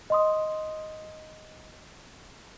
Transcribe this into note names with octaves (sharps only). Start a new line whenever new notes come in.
D#5 C6 D#6